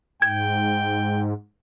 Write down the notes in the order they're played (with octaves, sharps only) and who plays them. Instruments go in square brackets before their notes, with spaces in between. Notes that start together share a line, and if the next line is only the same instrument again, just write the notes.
[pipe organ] G#2 [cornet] G5 [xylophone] G#6